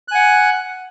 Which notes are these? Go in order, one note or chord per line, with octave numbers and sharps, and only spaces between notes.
F#5 G#5 F#6